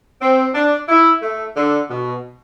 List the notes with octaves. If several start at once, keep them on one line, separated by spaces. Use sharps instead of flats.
C4
D4
E4
A3
D3
B2